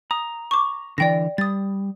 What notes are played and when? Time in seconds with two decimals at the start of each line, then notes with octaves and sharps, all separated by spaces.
0.11 A#5 D#6
0.51 C#6 D6
0.98 D3 E3 D5 G5 A#6
1.38 G3 D#6 A6